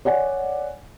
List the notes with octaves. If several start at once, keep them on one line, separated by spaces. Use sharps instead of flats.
C#5 D5 F#5 G#5